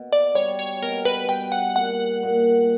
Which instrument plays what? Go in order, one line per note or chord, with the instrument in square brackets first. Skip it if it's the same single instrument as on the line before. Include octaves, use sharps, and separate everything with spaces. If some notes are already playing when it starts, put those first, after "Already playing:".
Already playing: [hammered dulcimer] B2
[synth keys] D5
[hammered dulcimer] G3 [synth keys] C#5
[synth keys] C#5
[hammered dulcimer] B2 [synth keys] A#4
[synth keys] B4
[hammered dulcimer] G3 [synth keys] G5
[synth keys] F#5
[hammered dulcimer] A#2 [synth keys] F#5
[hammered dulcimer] A#2